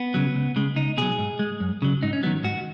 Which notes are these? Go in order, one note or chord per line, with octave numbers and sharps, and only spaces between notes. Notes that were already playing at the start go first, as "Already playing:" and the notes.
Already playing: B3
C#3 F#3
C#2
C#3 G#3
C#2 D#4
B2 F#3 G#4
G#2
G#3
F#2
C#3 F#3
G#2 D#4
C#4
D#3 F#3 B3
G#2 F#4